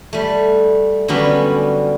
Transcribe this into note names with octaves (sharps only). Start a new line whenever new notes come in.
G3 A3
D3 F#3 G3 B3 C#4